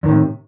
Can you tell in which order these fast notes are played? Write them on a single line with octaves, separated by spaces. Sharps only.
E2 D#3 A2 C3